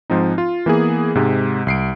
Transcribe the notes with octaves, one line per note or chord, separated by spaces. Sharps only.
G#2 F3 C4 D#4
F4
E3 A#3 B3 G#4
G#2 C3 G#3
C2 C7 D7